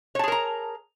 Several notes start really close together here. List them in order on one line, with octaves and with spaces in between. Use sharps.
C#5 A5 G#4 A#4 A#5